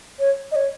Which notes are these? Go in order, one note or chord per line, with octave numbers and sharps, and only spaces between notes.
C#5
D#5
C#5